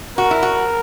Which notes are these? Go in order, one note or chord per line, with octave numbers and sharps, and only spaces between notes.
F#4 A#4
E4
F#4